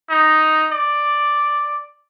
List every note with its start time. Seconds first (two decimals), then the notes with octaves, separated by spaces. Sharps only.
0.10 D#4
0.72 D5